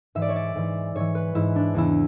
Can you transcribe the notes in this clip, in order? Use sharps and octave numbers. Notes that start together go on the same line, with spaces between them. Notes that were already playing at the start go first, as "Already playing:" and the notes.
G#2 E3 E5
D5
C#5
D5
G#2 E3
G#2 E3 C#5
B4
G#2 E3 E4
D4
E2 C#3 E3 E4